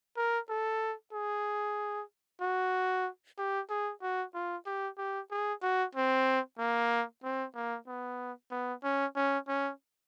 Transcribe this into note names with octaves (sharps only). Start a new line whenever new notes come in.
A#4
A4
G#4
F#4
G4
G#4
F#4
F4
G4
G4
G#4
F#4
C4
A#3
C4
A#3
B3
B3
C#4
C#4
C#4